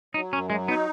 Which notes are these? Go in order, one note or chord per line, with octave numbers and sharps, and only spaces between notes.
F#3 D#4
F#2 C#4
F#3 G#3
B3 D#4